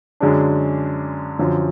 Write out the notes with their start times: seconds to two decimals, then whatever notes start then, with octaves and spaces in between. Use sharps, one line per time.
0.20 F#2 D3 G#3 D4
1.39 F#2 D3 F3